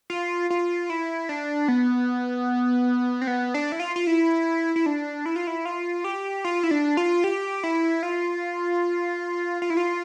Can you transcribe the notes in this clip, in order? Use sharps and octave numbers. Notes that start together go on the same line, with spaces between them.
F4
F4
E4
D4
B3
C4
B3
D4
E4
F4
F4
E4
E4
D4
E4
F4
E4
F4
G4
F4
E4
D4
F4
G4
E4
F4
F4
E4
F4